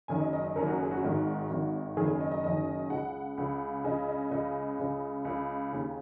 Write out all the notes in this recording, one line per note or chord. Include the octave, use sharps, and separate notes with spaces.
F#1 F#2 D#3 G#5
D#5
D#5
D#5
F#1 F#2 D#3 A#4
F#4
G#4
F#4
G#1 G#2 D#3 F#4
G#1 G#2 D#3
F#1 F#2 D#3 G#4
G#4
D#5
D#5
F#1 F#2 D#3 D#5
C#2 C#3 F#5
C#2 C#3
C#2 C#3 D#5
D#5
C#2 C#3 D#5
C#2 C#3
C#2 C#3
D#2 C#3